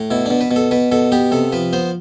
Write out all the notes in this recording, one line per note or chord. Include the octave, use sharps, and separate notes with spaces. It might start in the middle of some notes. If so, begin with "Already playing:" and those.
Already playing: A2
B2 E4
B2 D4
B4
B2
A4
B2 B4
B2 A4
B3 G4
C3 A4
F3 B4
B3 C5